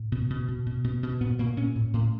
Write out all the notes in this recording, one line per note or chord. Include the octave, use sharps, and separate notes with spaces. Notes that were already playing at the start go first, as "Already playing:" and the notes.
Already playing: A2
B2
B2
B2
B2
B2
B2
A#2 B3
A#2 A#3
A#2 C#4
A2
A2